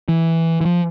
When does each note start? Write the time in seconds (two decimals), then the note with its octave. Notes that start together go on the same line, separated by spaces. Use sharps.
0.09 E3
0.61 E3
0.65 F3